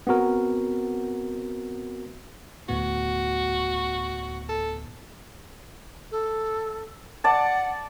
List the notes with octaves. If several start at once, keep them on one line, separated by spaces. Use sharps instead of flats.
B3 C4 F#4 A#4
D2 A2 B3 F#4
A4
A4
D5 F#5 A5